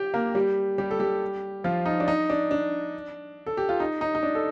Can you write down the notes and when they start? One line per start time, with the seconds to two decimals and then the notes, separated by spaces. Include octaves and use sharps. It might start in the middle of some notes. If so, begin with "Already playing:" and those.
Already playing: G4 G5
0.14 A#3 A#4
0.35 G3 G4
0.78 G3 G4
0.91 A4
1.00 G3 G4
1.64 F3 F4
1.86 D#4
2.00 D4
2.08 D#4
2.30 D4
2.51 D4
3.46 A4
3.57 G4
3.69 F4
3.80 D#4
4.01 D#4
4.15 D#4
4.23 D4
4.35 A4